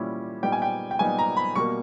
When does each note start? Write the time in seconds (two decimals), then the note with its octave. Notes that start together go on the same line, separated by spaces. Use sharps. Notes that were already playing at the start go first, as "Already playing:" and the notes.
Already playing: A#2 G3 C#4 E4
0.43 A#2 G3 B3 D#4 G5
0.52 G#5
0.62 G5
0.91 G5
0.99 A#2 G3 B3 D#4 G#5
1.19 A#5
1.37 B5
1.55 B2 G3 A#3 C#6